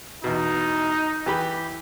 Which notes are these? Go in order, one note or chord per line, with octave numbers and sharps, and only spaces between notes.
E2 B2 D#4
E3 G4 B5